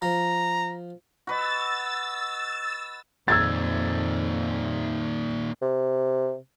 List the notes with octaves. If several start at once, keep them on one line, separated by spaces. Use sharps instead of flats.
F3 A#5
F#4 B4 D#5 E6 A6
F2 A#2 D#3 E6 G#6 A6
C3